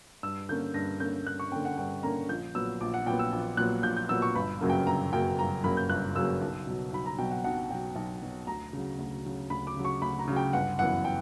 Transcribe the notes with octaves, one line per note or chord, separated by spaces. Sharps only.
G2 E6
D3 A#3 C#4 G6
G2 A#6
D3 A#3 C#4 G6
G2 F#6
C#6
D3 A#3 C#4 G5
F#5
G2 G5
D3 A#3 C#4 A#5
A#1 G6
A#2 F#3 B3 E6
A#1 D6
F#5
A#2 F#3 B3 G5
E6
A#1
A#2 F#3 B3 F#6
A#1 G6
G6
A#2 F#3 B3 E6
C#6
G1 B5
F#2 C#3 F#3 A#3
G5
G1 A#5
F#2 C#3 F#3 A#3 G5
G1 A#5
F#2 C#3 F#3 A#3 B5
G6
G1 F#6
F#2 C#3 F#3 A#3 E6
B1
B2 F#3
B1 B5
A#5
B2 F#3 G5
F#5
B1 F#5
B2 F#3 G5
B1
B2 F#3
D2 A#5
C#3 F#3
D2
C#3 F#3
D2 B5
D6
C#3 F#3
C#6
D2 B5
A#5
C#3 F#3
G5
G1 F#5
F#2 E3 B3 F#5
G5